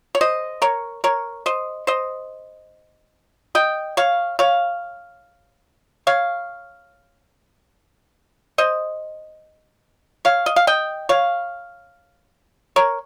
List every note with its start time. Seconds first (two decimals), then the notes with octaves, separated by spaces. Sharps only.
0.15 C#5
0.21 C5 D#5
0.62 A#4 C#5
1.04 A#4 C#5
1.46 C5 D#5
1.87 C5 D#5
3.55 D#5 G5
3.97 C#5 F5
4.39 C#5 F5
6.07 C#5 F5
8.58 C5 D#5
10.25 C#5 F5
10.46 D#5
10.56 F5
10.67 D#5 G5
11.09 C#5 F5
12.76 A#4 C#5